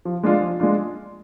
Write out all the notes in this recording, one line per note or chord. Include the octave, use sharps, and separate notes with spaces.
F3
G#3 D4 F4
F3
G#3 D4 F4